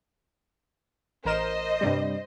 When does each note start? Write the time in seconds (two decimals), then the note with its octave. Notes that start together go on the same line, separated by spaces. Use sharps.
1.25 A1 A#4 C5 D#5 E7
1.81 G2 C3 G3